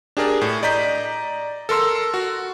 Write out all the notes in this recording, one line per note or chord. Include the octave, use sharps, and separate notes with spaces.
D4 G4 G#4 A#4 D5
A2
D5 D#5 A#5 G6 B6
A4 A#4 C6 E6
F#4